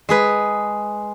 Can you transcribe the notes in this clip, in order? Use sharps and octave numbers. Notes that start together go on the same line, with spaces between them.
G#3 G#4 B4